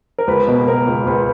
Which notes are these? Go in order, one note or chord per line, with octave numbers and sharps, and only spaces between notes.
A#4
C#2 B4
B2
B2 A#4
C#2
C#2 B4